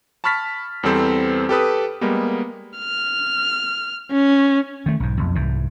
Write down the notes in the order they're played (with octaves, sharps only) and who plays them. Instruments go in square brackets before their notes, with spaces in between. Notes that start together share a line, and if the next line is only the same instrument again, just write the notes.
[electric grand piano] A5 B5 C#6 F6 A6 B6
E2 G3 B3 C4 A4 C5
G4 A4 B4 D#6
G3 G#3 A#3 B3
[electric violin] F6
C#4
[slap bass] D#3 A3
B1 G#2
B1 F2
C2 G#2 E3